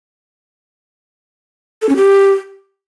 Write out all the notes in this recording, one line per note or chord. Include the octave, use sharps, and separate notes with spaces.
A4
C#4
G4